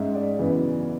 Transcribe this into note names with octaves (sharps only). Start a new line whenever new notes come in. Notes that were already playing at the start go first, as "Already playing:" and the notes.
Already playing: G#2 G#3 C#4 E5
D5
F#2 C#3 E3 B3